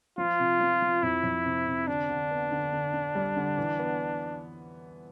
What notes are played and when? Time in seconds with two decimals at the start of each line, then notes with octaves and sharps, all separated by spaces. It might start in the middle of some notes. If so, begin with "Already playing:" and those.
0.18 F3 F4
0.40 C3
0.60 F3
0.82 F3
1.03 F2 E4
1.24 F2
1.46 C3
1.67 C3
1.87 D3 D4
2.09 D3
2.31 B3
2.52 D3
2.73 D3
2.94 D3
3.15 G3
3.36 D3
3.58 E3
3.79 B3